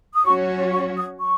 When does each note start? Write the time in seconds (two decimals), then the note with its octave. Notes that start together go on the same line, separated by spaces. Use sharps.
0.13 D#6
0.25 F#3 C#4 F#4 C#5 C#6
0.72 C#6
0.96 D#6
1.20 C#6